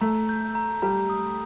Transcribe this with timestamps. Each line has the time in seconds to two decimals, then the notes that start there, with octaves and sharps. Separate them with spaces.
0.01 A3 A#5
0.29 G6
0.55 A#5
0.82 G3 A#5
1.10 D#6